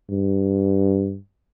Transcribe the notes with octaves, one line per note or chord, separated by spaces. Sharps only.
G2